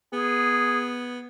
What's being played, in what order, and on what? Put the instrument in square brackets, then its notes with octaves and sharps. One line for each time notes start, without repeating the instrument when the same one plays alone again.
[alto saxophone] B3 [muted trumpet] G#4